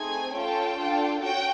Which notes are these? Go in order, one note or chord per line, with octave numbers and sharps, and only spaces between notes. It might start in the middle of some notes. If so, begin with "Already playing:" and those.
Already playing: A3 C4 D#4 G#4 G#5
C#4 F4 A4 G5
D4 F4 A4
C#4 F#4 G5